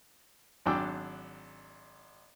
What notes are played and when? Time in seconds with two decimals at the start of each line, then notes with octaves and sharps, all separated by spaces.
0.66 G#1 F#3 D4 G5 D6 E6